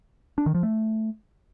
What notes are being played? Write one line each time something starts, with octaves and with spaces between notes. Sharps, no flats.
D4
D#3
F3
A3